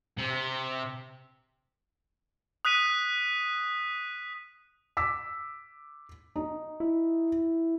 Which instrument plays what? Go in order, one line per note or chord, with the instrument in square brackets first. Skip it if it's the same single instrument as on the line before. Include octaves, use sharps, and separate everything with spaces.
[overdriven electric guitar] C3
[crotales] D#6 F#6 B6 D#7
[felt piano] D6 E6 B6
D#4
[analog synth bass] E4